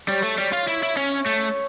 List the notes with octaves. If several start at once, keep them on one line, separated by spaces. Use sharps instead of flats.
G3 C#5
A3
G3 C#5
F4
E4
E4
C#4 C#5
A3